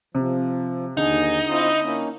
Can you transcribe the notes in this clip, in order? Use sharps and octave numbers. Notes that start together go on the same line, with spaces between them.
C3 F3
D#2 D3 D#4 G#4
C4 E4 F4 D#5
A#3 C#4 D#4